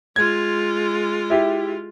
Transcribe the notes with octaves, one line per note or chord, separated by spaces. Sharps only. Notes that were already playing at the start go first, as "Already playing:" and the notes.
G#3 F4 G#6
E4 G4